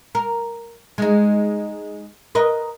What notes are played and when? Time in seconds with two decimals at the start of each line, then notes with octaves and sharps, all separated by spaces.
0.15 A#4
0.98 G#3 D#4
2.35 A#4 B4 D#5